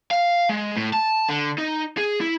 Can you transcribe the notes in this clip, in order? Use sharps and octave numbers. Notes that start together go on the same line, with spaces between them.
F5
G#3
A2
A5
D3
D#4
G#4
E4